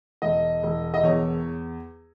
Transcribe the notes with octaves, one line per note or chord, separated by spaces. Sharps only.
E1 D#5
E1
D#5
E2 C#5